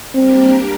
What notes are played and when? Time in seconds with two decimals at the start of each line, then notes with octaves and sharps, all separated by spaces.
0.15 G3 A#3 C4 D4 G4 A#4